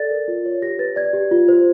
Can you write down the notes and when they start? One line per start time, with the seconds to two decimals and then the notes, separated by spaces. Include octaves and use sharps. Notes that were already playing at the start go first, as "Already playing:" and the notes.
Already playing: A4 D5 A6
0.11 A#4
0.28 F4
0.45 C#5
0.62 G4 A#6
0.79 B4 A6
0.96 D5 G#6
1.13 G4
1.31 F4
1.48 C5